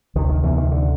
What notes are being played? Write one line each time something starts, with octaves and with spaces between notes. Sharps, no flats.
D2 C3 D#3
D#3
E2 E3
D#3
D3